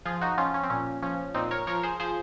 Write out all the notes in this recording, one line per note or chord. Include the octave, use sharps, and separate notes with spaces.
F3 F4 G#4
D#4 F#4
F3 C#4 F4
C#4
C4
A#2 C#4
F3 C#4
A#2 C4 D#4
A#4 C#5
F3 A#4 C#5
G#4 C5
F3 G#4 C5